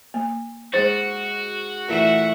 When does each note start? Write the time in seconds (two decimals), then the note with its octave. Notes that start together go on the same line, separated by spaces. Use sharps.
0.14 A#3
0.74 G#2 F#4 C5
1.88 A#2 E3 A3 E5 F#5